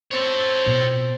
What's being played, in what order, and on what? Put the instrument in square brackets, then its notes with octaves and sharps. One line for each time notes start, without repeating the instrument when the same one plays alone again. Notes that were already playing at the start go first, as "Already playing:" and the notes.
[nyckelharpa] C4 [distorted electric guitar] A4 C#5
[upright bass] B2 F4